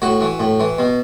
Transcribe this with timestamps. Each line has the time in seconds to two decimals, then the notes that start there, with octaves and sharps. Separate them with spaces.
0.02 A2 F#4
0.21 E3
0.40 A2
0.60 E3
0.78 B2